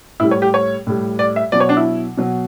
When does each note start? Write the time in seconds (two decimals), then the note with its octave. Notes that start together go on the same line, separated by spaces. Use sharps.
0.20 A2 G3 E4
0.31 C#5
0.42 G4
0.54 C#5
0.87 A2 G3
1.19 D5
1.36 E5
1.52 B2 F#3 D5
1.60 C#5
1.69 D4
1.77 E4
2.17 B2 F#3